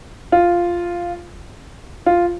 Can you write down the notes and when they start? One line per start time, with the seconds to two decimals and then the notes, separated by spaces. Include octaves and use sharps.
0.32 F4
2.06 F4